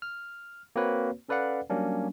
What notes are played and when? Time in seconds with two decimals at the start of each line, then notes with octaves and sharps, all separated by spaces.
0.02 F6
0.76 A#3 C4 F#4 B4 C#5
1.29 C#4 A4 B4 D5 F5 F#5
1.70 F#3 G3 A#3 C#4 D4